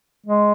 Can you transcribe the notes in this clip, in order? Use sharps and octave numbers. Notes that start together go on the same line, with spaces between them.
G#3